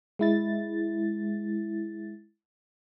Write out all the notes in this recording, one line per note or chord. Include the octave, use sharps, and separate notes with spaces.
G#3 E4 A6